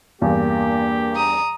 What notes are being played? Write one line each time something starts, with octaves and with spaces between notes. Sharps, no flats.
E2 G2 A#3 G4
A#5 D#6